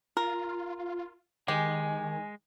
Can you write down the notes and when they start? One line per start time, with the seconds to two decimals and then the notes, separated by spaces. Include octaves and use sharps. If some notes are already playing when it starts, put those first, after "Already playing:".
0.17 F4 A#4
1.48 D#3 G#3 G4 G#5